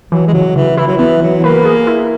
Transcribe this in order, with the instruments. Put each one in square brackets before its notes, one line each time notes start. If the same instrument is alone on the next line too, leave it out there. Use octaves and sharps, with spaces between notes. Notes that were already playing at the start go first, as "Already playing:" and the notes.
[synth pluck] E3 [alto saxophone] F#3
[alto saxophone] G#3
[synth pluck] C#3 [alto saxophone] F#3
[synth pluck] C#3 [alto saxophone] E3
[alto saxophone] E3 [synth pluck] E4
[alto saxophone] F#3
[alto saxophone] E3 [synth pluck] B3
[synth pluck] E3 [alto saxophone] F#3
[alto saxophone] A#3 [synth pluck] B4
[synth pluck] G#4
E4